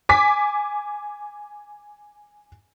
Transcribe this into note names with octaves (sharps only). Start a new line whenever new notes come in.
G#5 D6 B6